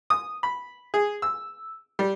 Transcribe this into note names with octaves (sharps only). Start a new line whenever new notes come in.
D#6
B5
G#4
E6
G3